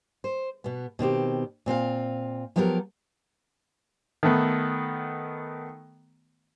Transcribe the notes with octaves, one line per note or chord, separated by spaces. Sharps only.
C5
B2 B3
B2 D#3 C4 G4
A#2 C4 F4 F5
F3 F#3 B3 G4 A4 A#4
D#3 A3 B3